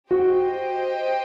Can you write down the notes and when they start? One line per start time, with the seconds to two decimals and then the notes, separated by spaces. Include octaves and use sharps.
0.11 F#4 G4 C5 D#5 G5